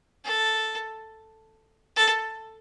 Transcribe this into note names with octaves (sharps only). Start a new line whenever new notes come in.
A4
A4